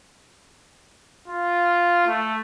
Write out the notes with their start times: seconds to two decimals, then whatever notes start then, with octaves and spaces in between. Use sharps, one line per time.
1.28 F4
2.07 A3